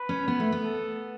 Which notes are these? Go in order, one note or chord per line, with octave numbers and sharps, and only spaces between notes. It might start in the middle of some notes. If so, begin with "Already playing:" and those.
Already playing: B4
C#4
B3
A3
B3
A4